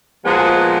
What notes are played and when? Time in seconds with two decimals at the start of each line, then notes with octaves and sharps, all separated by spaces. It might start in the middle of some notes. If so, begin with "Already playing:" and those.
0.24 A#2 F3 G#3 B3 F#4 G#4